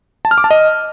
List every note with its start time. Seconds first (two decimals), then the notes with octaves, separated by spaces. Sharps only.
0.25 A5
0.31 F6
0.38 D6
0.44 A5
0.51 D#5